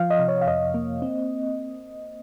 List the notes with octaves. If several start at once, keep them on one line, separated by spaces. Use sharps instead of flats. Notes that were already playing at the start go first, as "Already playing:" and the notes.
Already playing: F3 F5
D#5
C3
C#5
F5
F2 D#5
A#3
C4